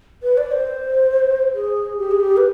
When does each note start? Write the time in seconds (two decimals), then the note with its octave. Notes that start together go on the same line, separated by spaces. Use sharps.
0.23 B4
0.37 D5
0.51 C5
1.55 G#4
1.98 G4
2.11 G#4
2.20 G4
2.37 B4